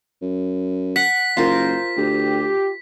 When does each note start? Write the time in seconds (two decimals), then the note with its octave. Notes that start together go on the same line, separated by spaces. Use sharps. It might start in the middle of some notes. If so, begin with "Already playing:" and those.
0.22 F#2
0.96 F#5 B6
1.37 F#1 F4 A#4 C5
1.97 D2 G4